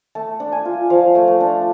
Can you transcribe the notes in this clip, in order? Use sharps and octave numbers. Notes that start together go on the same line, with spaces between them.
A3 A5
D4
G#5
F4
F3 F5
A3
A5
D4